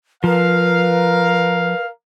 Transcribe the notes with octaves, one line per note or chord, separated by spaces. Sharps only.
F3 A#4 B4 F5